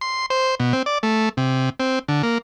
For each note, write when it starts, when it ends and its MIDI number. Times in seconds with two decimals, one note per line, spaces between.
0.01 0.26 84
0.30 0.55 72
0.60 0.73 47
0.73 0.83 60
0.86 0.98 74
1.03 1.29 57
1.37 1.70 48
1.80 1.99 60
2.08 2.22 50
2.23 2.38 58